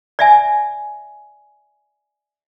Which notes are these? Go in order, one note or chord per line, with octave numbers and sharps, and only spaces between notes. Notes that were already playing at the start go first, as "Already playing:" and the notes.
D5 E5 G#5